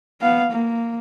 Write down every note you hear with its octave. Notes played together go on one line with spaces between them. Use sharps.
B3 F5
A#3